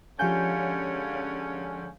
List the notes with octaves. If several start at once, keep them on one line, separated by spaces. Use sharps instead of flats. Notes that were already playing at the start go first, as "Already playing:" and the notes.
D3 F3 G#3 C#4 G4 F5 G#5 G6